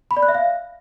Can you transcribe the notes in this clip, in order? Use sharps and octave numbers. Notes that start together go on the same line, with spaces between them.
B5
D5
F#6
E5
F5